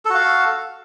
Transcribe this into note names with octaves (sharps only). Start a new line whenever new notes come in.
F#4 A4 F5